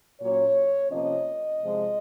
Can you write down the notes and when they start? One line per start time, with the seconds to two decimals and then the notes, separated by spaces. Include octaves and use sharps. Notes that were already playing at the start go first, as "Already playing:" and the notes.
0.21 A#2 F#3 A#3 C#4 C#5
0.90 C3 F3 A#3 C#4 D#5
1.60 C3 F3 G#3